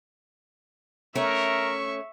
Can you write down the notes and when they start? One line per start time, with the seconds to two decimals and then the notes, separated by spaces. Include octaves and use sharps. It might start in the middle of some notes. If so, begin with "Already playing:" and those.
1.15 A3 C#4 A#4 E5 C#6